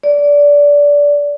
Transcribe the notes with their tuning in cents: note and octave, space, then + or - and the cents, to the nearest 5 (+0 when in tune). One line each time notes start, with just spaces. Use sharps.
D5 -20